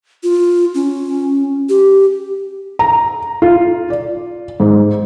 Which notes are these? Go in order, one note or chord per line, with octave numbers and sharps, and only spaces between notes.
F4
C#4
G4
A#5
F4
D5
G#2